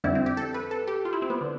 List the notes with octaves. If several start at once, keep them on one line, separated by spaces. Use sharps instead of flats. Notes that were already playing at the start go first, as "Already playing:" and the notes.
F2 D3 G3 E4
C4
G4
A4
B4
A4
G4
F4
E4
C4
B3
D3